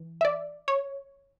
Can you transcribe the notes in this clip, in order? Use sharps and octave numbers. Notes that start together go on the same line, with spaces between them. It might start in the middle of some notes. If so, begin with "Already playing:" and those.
Already playing: E3
E5
D5
C#5